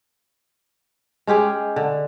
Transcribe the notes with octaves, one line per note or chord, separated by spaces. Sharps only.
G#3 C#4 G4 G#4
D3